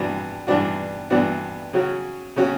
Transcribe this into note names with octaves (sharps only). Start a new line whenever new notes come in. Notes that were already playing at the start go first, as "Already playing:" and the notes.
Already playing: G2 E3 B3 D4 F#4
G2 E3 B3 D4 F#4
G2 E3 B3 D4 F#4
C#3 F#3 C#4 F#4
C#3 F#3 C#4 F#4